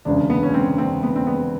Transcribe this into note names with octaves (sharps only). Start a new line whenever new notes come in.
E1 D2 C#3 D4
B3
C#4
C4
C4
B3
C4
B3